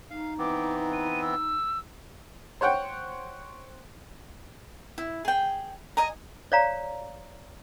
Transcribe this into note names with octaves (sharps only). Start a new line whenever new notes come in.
D#4 F5
E3 B3 C4 D6
D#7
E6
C5 C#5 F#5 G5
E4
G#4 G5
D#5 G#5 A#5
C#5 D5 F5 A#5